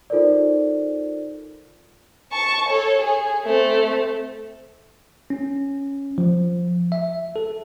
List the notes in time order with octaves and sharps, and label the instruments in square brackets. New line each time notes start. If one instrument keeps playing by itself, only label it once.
[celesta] D#4 F4 A4 A#4 C5 D5
[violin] A5 C#6
A4 C#5
G#4
A3 C4
[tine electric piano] C#4
F3
E5
A4